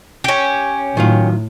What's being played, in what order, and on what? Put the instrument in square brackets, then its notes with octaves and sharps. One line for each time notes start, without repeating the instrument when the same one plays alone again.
[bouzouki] C#4 G4
[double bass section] A2 [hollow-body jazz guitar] D#3 F#3 F4